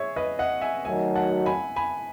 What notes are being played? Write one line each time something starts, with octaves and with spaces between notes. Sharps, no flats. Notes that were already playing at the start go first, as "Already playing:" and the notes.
Already playing: G#4 C#5 E5
B4 D#5
D#5 F#5
E5 G#5
D#3 F#3 A3 D#4 F#4 E5 G#5
F#5 A5
G#5 B5
G#5 B5